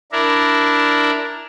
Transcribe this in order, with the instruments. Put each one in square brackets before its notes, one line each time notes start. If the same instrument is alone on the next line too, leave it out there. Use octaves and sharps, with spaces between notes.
[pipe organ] D4 E4 A#4